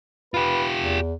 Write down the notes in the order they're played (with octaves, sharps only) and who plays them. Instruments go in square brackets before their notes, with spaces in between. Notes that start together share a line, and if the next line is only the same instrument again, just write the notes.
[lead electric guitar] F4 G4 [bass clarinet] B4
[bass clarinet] E2